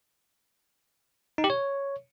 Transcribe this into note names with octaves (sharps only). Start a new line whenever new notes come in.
D#4
G4
C#5